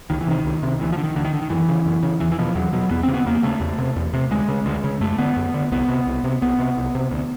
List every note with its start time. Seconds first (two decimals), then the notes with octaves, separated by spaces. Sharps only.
0.10 C#2 D#3
0.21 E3
0.27 C3 D#3
0.45 C#2
0.62 C3
0.80 D2 E3
0.92 F3
0.98 D3
1.04 D#3
1.15 D2 D3
1.25 D#3
1.34 D3
1.42 D#3
1.50 F#2 E3
1.69 C#3
1.86 F#2
2.03 C#3
2.20 E2 E3
2.32 E3
2.38 B2 F3
2.55 E2 F#3
2.73 B2 F#3
2.91 E2 B3
3.03 C#3 C4
3.14 B3
3.26 E2 A#3
3.43 C#3 A3
3.61 E2
3.78 C3
3.96 E2
4.13 C3
4.31 D2 G#3
4.48 C#3
4.66 D2
4.84 C#3
5.01 F#2 A3
5.18 D3 B3
5.36 F#2
5.54 D3
5.72 C2 B3
5.89 C3
6.07 C2
6.24 C3
6.42 C2 B3
6.59 C3
6.77 C2
6.95 C3
7.11 D2